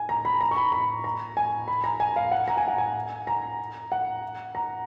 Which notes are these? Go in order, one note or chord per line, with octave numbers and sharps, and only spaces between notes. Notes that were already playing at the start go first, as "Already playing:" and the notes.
Already playing: G#5
A#5
B5
A#5
C#6
B5
B5
A#5
G#5
B5
A#5
G#5
F5
F#5
A#5
G#5
F#5
G#5
A#5
F#5
A#5